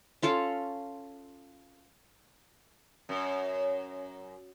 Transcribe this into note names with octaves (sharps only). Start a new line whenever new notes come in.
C#4 F4 A4 F5
F#2